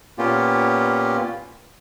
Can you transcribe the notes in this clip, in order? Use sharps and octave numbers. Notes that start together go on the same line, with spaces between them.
A#2 A#3 B3 C#4 F4 G4